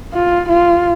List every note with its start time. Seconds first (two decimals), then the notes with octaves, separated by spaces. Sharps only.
0.14 F4
0.49 F4